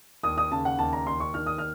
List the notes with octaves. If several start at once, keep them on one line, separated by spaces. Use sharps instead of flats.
D#2 D#6
D#6
C#3 A5
F#5
D#2 A5
A#5
D#2 C6
C#6
D#3 F6
D#6
F6